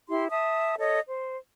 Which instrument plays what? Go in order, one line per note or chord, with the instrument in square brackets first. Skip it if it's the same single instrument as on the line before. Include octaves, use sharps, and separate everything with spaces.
[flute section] E4 G4 C6
E5 A5 D#6
A4 C#5 D#5
C5